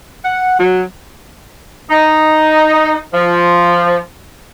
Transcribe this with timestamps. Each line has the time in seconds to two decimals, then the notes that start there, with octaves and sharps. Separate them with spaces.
0.24 F#5
0.58 F#3
1.90 D#4
3.14 F3